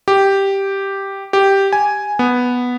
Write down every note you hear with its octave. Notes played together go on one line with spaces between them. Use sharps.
G4
G4
G#5
B3